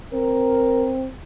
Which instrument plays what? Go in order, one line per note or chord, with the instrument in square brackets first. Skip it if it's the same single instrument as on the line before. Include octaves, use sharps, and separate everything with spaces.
[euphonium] C4 [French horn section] A#4